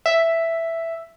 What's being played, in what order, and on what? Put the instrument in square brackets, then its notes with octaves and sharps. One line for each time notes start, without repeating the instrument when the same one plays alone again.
[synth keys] E5